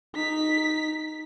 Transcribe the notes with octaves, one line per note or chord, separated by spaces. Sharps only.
D#4 B6